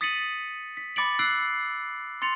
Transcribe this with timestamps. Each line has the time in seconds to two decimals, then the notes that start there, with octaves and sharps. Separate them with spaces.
0.01 D#6 A6 B6 C#7 D#7 F#7
0.77 B6
0.96 B5 D6 A6 C#7 D7 F#7
1.19 E6 F#6 C7 D7 F#7
2.22 C6 A6 C#7 F7